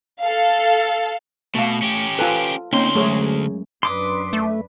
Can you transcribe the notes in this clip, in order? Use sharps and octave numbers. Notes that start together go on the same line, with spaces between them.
A4 F5
B2 A3 F5
C#4 G4
F4 A4 B4 G#5
D2 A#3 C4 C#4 D#4 C6
F#2 G#3 A3 G#4 C#5
F#2 D4 B4 C6 D6 D#6
A3